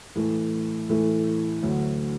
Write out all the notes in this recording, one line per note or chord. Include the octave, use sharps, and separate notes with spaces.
A2 E3 A3
A2 E3 A3
D2 D3 F#3